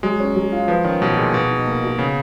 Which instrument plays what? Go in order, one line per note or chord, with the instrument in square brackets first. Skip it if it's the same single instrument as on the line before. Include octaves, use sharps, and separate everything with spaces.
[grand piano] F#3 [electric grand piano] G#3
[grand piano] C#4
F#3
F4
[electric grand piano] F3 [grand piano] B4
[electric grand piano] D#3 [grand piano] C#4
[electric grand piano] B2 [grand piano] F#3
[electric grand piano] A#2 [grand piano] G#4
[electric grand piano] B2 [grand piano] B4
[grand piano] D#4
A#3
F#4
[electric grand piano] C#3 [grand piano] B3